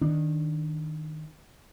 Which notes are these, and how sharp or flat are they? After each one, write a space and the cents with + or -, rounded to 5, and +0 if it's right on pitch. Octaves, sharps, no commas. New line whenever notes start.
D#3 +0 D4 +0